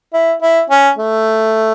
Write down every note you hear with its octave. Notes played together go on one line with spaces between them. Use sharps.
E4
E4
C#4
A3